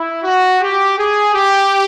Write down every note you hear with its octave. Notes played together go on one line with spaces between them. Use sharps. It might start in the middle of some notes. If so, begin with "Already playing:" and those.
Already playing: E4
F#4
G4
G#4
G4